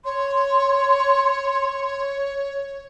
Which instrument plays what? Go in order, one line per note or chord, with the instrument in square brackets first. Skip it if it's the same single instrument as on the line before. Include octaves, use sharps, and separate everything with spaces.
[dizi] C#5 [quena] C6